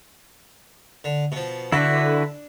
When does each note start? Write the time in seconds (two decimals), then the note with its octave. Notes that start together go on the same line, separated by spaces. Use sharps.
1.04 D3
1.32 B2 F3
1.72 D3 D4 E4 F#4 B4